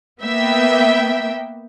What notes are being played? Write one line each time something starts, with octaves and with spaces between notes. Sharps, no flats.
A#3 B3 E5 G5